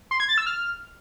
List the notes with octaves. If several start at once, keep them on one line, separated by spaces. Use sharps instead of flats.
C6
G#6
A6
E6
F6